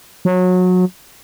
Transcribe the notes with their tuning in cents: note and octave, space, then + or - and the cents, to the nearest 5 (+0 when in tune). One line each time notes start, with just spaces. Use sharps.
F#3 -25